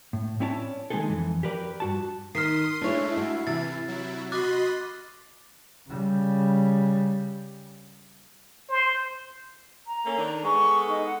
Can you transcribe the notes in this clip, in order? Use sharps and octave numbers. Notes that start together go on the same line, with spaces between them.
A2
C4 C#4 E4 C#5 D5 A5
D#3 G#3 D4 D#4 G#4 A4
F2 A2 E3
G4 A#4 B4 D5
G2 F#4 A5
D#3 C6 D#6 F6 B6 C7
G#3 A3 D4 E4 C#5
D4 F#4
C3 E3 A6
F#3 E4
F#4 D#5 B5 C6 D6 F#6 A6
C#3 G3
C5
A#5
A#3 C#4 A4
D#3 D4
G#3 B3 A4 C#6
D#4
F#5